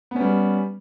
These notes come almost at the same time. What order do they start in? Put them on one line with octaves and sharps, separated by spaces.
B3 C#4 G3